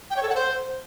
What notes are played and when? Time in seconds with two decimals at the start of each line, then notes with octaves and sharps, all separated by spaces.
0.10 G5
0.16 C#5
0.23 A4
0.29 F#5
0.35 C5